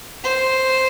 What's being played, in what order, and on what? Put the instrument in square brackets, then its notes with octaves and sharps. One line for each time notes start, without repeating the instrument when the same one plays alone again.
[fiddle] C5